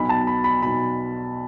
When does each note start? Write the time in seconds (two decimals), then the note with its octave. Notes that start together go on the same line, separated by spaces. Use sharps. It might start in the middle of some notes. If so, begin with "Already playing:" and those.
Already playing: B1 B2 B5
0.09 A5
0.27 B5
0.44 B5
0.62 B1 B2 B5